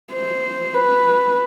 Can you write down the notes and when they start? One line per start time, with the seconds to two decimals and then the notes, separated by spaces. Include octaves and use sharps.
0.13 C5
0.75 B4